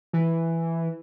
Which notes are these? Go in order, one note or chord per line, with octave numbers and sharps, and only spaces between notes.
E3